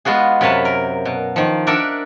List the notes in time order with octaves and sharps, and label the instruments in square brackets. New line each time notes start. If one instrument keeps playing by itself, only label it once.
[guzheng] G#3 B3 F4 F#4 G#4
F#2 C3 B4 C#5 F5 A5
A#4
B2
D#3 F3
D4 A#4 D5 E5 F#5